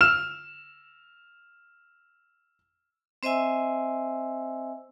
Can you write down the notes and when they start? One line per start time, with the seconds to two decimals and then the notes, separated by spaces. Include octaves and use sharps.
0.01 E6 F6 E7
3.23 C4 C5 D#5 E5 G#5 E6